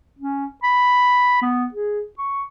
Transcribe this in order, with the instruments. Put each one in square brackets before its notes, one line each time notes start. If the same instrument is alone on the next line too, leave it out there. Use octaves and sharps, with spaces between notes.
[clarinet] C#4
B5
B3
G#4
C#6